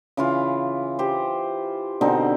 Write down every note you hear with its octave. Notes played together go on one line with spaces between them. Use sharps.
C#3 E3 F4
G4 C5
B2 D3 C4 D#4